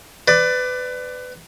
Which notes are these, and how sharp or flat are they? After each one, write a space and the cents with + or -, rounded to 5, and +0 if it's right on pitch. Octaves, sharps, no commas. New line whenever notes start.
B4 +25 D5 +10